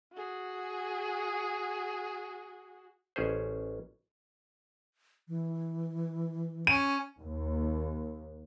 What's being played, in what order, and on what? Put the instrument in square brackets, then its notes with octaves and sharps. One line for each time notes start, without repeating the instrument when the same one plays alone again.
[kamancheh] F#4 G#4
[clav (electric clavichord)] A1 C#4 G#4 C5
[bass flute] E3
[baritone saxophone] C#4 [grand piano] D#7
[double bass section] D#2